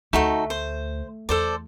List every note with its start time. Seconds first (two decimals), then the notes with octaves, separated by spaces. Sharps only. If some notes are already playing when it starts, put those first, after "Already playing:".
0.13 D2 A3 D#4 F#4 A4
0.50 C5
1.29 E2 A4 C5 D5